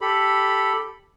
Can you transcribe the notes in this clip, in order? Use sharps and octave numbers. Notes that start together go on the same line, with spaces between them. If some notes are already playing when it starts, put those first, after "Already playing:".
G4 A4 B5